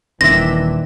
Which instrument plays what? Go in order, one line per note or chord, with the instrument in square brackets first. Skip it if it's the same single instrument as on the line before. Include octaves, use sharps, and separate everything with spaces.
[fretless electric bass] D#1 D#3 [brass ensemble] E3 [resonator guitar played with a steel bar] C4 D4 E5 [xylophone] A#6